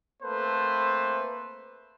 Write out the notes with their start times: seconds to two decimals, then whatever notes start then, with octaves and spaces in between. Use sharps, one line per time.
0.23 A3 A#3 C4 A4 B4 C5